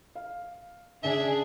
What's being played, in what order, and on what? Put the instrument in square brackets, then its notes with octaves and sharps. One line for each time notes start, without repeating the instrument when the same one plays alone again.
[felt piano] F5
[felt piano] C#3 [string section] D4 G#4 [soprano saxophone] E5